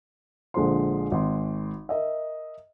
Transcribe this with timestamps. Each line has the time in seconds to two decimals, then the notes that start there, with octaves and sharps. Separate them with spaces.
0.54 A#1 D3 G#3 F4 C5 C6
1.12 G#1 C6
1.89 A#4 D#5 E5